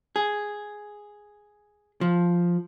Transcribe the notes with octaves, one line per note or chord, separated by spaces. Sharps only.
G#4
F3